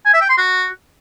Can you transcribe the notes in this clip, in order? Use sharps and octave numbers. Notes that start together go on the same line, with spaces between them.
G#5
E5
G5
C6
F#4